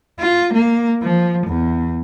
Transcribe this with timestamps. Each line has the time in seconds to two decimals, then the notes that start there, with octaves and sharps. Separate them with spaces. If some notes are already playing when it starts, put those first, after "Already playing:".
0.19 F4
0.54 A#3
1.02 F3
1.47 E2